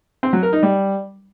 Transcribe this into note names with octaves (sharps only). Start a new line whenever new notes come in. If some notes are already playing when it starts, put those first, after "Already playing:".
C4
F#3
A#4
D#4
G3